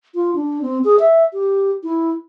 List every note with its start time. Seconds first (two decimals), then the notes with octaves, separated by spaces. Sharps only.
0.15 F4
0.35 D4
0.62 C4
0.84 G#4
0.99 E5
1.33 G4
1.83 E4